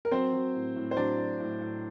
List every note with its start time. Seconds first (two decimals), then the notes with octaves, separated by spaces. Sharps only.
0.05 A#4
0.11 F#3 C4 C5
0.33 F#3
0.55 A2
0.76 A2
0.91 C5
0.96 F#3 D4 D5
1.18 F#3
1.40 A2
1.61 A2